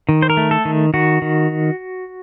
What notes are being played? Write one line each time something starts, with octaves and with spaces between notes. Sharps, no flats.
D#3
C5
A#4
A3
A4
D#3
D#3 F#4
D#3